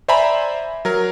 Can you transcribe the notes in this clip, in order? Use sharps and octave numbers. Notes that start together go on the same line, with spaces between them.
C5 D5 E5 G#5 A#5 B5
F#3 A#4